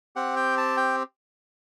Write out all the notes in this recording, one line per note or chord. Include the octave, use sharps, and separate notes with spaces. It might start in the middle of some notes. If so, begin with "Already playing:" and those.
C4 G4 F#5
G5
A5
G5